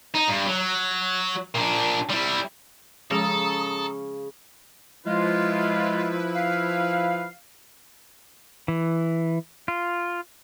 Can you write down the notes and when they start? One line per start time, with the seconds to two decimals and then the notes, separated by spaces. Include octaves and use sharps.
0.15 D#4
0.29 G2
0.47 F#3
1.55 A#2 D4
2.10 G3 E4
3.11 C#3 F3 G#3 G#4 A4 A#5 D#6
5.06 F3 G#3 E4 F4 B4
6.34 F5
8.68 E3
9.68 F4